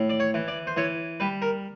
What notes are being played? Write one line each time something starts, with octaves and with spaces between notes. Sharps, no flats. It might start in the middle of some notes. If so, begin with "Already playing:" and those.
Already playing: A2
D5
C#5
E3
D5
C5
E3 C#5
G3 B4
A#4